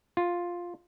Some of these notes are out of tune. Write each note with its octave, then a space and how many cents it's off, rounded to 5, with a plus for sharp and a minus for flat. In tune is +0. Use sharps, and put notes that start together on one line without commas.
F4 +5